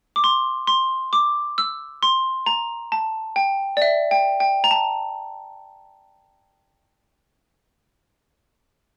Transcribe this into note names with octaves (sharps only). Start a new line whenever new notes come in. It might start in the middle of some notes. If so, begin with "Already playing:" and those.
D6
C6
C6
D6
E6
C6
A#5
A5
G5
D5
E5
G5
G5
A#5
A5